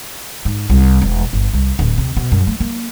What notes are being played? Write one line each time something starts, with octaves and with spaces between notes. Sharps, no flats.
G#2
C2
E1
G1
C2
D1
C3
B2
F#2
A3
A#3